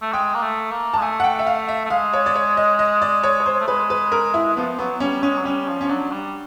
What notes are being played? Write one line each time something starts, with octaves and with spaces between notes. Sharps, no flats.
A3
G#3 G5
A#3
A3
A#3
A5
G#3
A3 G#5
F#5
G5
E5
F5
E5
A3
G#3 F5
C#5
D5
C#5
D#5
D#5
D5
C#5
C#5
C5
A3
G#3 B4
B4
A#4
E4
F3 B3
F#3 B3
G3 C#4
G#3 C#4
F#3
G3 C#4
F3
C#4
F#3 D4
G3